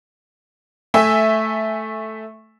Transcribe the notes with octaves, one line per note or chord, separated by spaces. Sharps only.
A3 E5 G#5